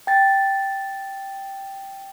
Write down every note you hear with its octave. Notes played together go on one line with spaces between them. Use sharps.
G5 A6